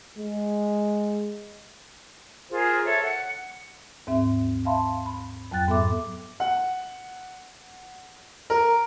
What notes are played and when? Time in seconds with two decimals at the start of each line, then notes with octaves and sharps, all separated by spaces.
0.18 G#3
2.50 F4 G#4 A#4 C5
2.84 A4 C#5 E5
3.02 F#5
4.07 D#2 G#2 C4 E5
4.65 E5 F5 A5 B5 C6
5.06 B5
5.51 F2 F#3 G5 F#6 A6
5.68 G#2 B3 A4 E5 D6
6.40 F#5
8.50 A#4